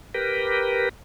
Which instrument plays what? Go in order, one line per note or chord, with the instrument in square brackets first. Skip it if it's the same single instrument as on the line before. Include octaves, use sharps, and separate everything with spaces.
[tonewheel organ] G4 A#4 B4